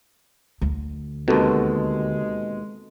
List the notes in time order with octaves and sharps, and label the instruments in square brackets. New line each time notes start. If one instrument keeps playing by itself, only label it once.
[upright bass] D2
[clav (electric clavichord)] D#2 B2 [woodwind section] G#3 [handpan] C4 F#4 A4